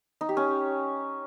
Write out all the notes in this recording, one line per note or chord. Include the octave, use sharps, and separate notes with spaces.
D#4
G4
C#4